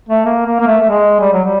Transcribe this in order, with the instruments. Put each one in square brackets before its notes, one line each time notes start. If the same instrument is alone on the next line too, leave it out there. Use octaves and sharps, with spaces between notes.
[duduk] A3
A#3
A#3
A#3
A3
A3
G#3
G3
F#3
G3